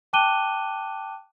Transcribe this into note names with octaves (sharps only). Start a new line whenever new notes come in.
G5 A5 D6 F#6 D#7 G7